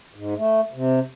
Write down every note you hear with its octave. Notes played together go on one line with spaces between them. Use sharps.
G#2
A3
C3